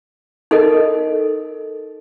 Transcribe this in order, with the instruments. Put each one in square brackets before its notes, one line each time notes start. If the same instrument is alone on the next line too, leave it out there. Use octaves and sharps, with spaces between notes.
[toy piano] D#4 A4 A#4 D#5